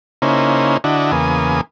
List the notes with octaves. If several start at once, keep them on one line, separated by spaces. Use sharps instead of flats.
C#3 A#3 C#4 D#4 E4 C5
D3 D4 E4 F#4 D#5
E2 C#3 A#3 B4 G#5 D#6